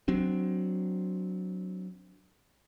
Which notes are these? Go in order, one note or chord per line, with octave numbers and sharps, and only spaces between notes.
F#3 C4 D4